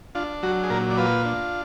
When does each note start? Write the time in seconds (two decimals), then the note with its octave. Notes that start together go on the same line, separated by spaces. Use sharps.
0.15 D4 F4
0.43 F#3 F#4
0.63 G#4
0.70 A#2 A#4
0.90 D5
0.97 F4 B4
1.25 D4